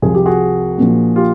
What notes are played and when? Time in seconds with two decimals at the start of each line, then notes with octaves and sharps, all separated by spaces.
0.02 C2 C3 F3 G#4
0.14 G4
0.26 F#4 G#4
0.78 A#1 A#2 F3
1.15 F4 G4